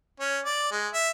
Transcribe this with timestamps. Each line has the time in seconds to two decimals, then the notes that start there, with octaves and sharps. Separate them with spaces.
0.20 C#4
0.45 D5
0.71 G#3
0.93 E5